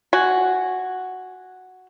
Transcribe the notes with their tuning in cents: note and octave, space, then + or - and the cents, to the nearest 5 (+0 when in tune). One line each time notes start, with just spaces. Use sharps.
F#4 +0 G#5 +0